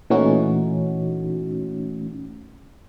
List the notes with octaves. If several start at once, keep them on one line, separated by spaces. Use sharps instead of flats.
A#2 E3 A3 C#4 D#4 F#4